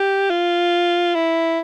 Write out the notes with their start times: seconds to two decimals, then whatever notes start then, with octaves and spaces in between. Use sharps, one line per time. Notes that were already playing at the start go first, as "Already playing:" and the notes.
Already playing: G4
0.30 F4
1.15 E4